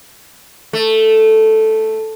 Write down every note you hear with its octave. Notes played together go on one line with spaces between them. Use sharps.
A3